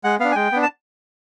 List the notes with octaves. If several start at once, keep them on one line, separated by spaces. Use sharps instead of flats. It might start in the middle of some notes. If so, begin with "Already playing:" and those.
G#3 F#5
B3 D4 F5
G#5
G#3 G5
B3 D4
A5